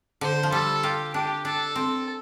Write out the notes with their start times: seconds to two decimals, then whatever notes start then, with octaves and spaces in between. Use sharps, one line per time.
0.21 D3 C5
0.43 F3
0.52 G3 A4
0.83 F4 G4
1.14 D4 G4
1.45 D4 A4
1.76 C4